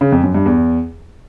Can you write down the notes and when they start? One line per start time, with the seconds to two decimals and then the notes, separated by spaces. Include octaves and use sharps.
0.01 C#3
0.12 F2
0.23 F#2
0.34 G2
0.46 E2